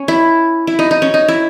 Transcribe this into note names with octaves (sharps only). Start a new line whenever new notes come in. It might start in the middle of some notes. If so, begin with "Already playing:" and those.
Already playing: C#4
E4
E4
D#4
D#4
C#4
D#4
E4